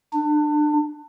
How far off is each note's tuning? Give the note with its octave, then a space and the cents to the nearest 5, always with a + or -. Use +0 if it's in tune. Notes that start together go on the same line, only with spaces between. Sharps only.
D4 +30